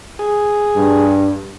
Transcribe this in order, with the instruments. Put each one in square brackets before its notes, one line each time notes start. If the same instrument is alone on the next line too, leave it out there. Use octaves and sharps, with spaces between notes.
[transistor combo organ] G#4
[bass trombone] G2